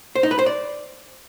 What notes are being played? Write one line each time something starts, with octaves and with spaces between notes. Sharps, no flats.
C5
D#4
B4
C5
D5